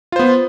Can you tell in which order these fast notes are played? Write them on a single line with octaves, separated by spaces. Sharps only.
F4 C5 B3